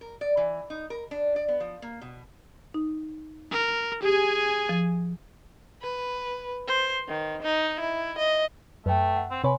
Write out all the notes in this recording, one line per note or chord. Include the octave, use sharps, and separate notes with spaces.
A#4
D5
E3
D#4
A#4
D4
D5
B3
F3
A#3
B2
D#4
A#4
G4 G#4 G#5
F3
B4
C5
D#3
D#4
E4
D#5
F#2 A3 B4 G5
F#5
C4
C3 B4 C#5 G#5 C6